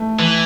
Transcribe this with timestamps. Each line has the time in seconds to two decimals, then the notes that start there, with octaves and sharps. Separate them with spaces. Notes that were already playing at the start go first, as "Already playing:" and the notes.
Already playing: A3
0.19 E3